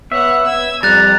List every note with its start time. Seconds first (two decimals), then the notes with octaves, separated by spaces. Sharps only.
0.12 B3 C#5 E5 F#5
0.46 B3 E6 G#6
0.83 F2 G3 A#5 F#6 A6